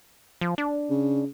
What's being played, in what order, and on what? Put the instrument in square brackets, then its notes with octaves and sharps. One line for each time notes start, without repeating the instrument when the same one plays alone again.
[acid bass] F3
D4
[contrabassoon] C#3